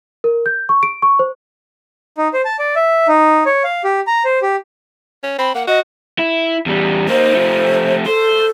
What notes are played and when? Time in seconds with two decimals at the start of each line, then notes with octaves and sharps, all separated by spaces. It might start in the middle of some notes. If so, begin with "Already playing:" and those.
0.24 A#4
0.46 G6
0.69 C#6
0.83 D7
1.02 C#6
1.19 C5
2.18 D#4
2.34 C5
2.45 A5
2.59 D5
2.76 E5
3.08 D#4
3.46 C#5
3.64 F5
3.84 G4
4.07 A#5
4.25 C5
4.42 G4
5.23 C#4
5.38 C4 B5
5.54 A#3 F#5
5.67 F#4 D#5
6.19 E4
6.66 E2 G3
7.09 A#3 D#4 C5
7.34 F3 A3
8.06 A4 C5